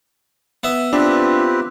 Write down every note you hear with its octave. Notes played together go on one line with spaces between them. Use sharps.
B3 E5
C4 D4 F4 G4 B4